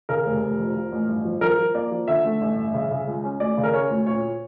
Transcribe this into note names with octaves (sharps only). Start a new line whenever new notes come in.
C#3 A#4
F1
F1
F2
F3
A1
G2
F3
F3 A#4
F3
A#3 D5
F3
D3 E5
A3
A1
G2
C#3
C#3
C#2
C#4
D2 D5
C#3
A#4
C#4 C#5
D2
A#2 C#5